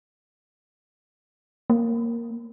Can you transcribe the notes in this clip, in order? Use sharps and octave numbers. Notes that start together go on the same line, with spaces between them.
A#3